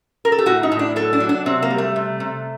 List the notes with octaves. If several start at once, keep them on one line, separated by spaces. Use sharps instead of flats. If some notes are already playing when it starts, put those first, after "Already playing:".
A#4
A4
G4
A2 F#4
D#4
A2
D4
F#3 A4
D4
F#3
D4
C3 C4
A#3
G3
A3
C3
C3